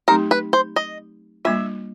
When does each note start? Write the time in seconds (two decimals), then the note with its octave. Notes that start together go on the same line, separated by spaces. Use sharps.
0.08 F#3 A3 C4 D#4 G4 A#4
0.31 B4
0.53 C5
0.76 D#5
1.45 G3 A#3 D4 F4 E5